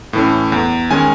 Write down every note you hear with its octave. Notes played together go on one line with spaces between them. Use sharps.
A2 E3 A3 C#4
E2
D#3 G#3 C#4 G#5